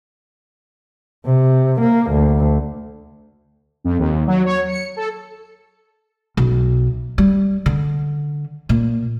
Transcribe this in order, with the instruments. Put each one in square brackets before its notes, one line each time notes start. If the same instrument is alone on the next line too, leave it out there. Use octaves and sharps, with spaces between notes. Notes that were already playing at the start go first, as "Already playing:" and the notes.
[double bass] C3
A#3
D2
[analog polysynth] F2
D#2
F#3
C#5
C#7
A4
[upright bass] B1
G3
D3
A#2